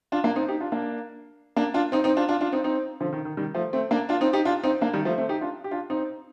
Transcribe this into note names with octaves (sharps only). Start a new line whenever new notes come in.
D4 F4
A#3 D4
C4 D#4
D#4 G4
D4 F4
A#3 D4
A#3 D4
D4 F4
C4 D#4
C4 D#4
D4 F4
D4 F4
D4 F4
C4 D#4
C4 D#4
D3 F3
D#3
D#3
D#3 G3
F3 A3
A3 C4
A#3 D4
D4 F4
C4 D#4
D#4 G4
D4 F4
C4 D#4
A#3 D4
D#3 G3
F3 A3
A3 C4
D#4 G4
D4 F4
G4
D4 F4
C4 D#4